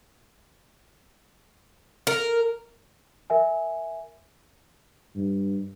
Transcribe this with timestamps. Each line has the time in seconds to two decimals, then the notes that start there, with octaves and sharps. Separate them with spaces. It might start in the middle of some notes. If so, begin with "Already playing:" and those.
2.07 A#4
3.30 A#4 E5 G#5
5.16 G2